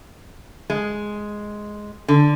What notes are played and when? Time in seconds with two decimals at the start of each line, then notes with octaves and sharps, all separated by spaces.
0.70 G#3
2.08 D3